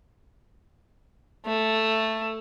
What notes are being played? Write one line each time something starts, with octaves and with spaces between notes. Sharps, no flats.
A3